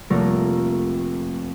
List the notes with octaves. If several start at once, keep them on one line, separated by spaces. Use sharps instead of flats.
F1 A3 A#3 A#4